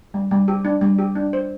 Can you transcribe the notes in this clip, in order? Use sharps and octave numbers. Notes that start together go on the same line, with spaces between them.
G3
G3
G4
D4
G3
G4
D4
C5